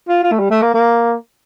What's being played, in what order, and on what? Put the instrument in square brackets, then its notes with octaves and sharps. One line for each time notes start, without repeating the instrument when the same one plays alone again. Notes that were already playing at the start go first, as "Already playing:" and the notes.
[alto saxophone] F4
F4
A3
G3
A3
A#3
A#3